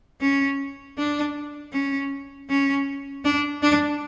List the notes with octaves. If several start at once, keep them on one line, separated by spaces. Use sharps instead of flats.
C#4
D4
C#4
C#4
D4
D4